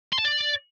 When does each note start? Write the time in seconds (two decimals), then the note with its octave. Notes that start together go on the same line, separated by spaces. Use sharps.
0.13 C6
0.19 A5
0.25 D5